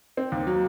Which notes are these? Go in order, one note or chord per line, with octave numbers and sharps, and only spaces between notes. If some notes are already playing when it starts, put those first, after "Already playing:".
C4
D#2
F#3